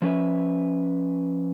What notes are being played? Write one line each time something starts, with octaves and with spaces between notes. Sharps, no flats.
F3 C#4 B4 E5